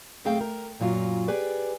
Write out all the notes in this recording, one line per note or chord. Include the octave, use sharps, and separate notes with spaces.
F#2 A3 C4 G#4 F5 G5
A#4
F#2 A#2 F#3 F4
G4 G#4 B4 D5